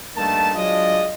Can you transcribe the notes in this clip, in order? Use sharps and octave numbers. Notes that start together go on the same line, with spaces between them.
G2 D#3 A3 A#3 A5
F#3 G#3 D4 F4 D5 D#5